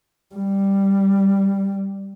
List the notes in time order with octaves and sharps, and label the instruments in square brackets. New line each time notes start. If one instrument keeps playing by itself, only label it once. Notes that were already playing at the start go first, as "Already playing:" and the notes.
[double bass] G3